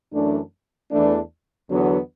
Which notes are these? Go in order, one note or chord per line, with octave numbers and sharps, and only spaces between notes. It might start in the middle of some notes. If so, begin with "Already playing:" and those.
F#2 E3 A3 D4
E2 E3 A3 D4
E2 D3 F#3 B3 D4